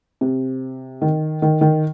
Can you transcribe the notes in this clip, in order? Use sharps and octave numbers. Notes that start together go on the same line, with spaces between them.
C3
D#3
D#3
D#3